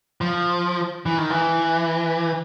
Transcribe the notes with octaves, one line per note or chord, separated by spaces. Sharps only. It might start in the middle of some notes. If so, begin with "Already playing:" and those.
F3
E3
D#3
E3